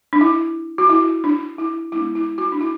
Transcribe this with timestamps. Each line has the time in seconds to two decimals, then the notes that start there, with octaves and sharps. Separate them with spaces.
0.13 D4
0.21 E4
0.78 F#4
0.89 E4
1.24 D4
1.58 E4
1.92 G#3 B3 D4 E4
2.15 E4
2.38 F#4
2.52 D4
2.61 E4